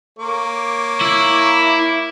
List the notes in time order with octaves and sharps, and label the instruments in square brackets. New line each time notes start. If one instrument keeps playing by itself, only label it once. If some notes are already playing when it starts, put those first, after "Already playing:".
[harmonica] A#3 C#5 D6
[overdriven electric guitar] E4